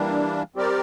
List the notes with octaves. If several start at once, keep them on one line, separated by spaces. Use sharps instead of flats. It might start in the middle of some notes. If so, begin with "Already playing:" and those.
Already playing: E3 G3 A#3 D4
G3 C4 G4 A#4 D5